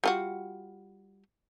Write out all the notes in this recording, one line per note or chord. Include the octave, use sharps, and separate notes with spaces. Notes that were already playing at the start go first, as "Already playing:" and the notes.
G3 F4 F#4